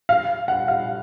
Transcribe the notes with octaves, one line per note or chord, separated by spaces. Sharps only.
F5
F#5
F5